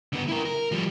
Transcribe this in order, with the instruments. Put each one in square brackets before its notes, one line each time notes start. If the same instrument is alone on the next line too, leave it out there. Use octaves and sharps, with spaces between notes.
[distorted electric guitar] D3 B3
E4 A#4
A#4
F3 G3